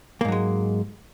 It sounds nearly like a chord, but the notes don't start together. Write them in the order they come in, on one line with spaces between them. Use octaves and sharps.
A#3 G#2 F#3 G#3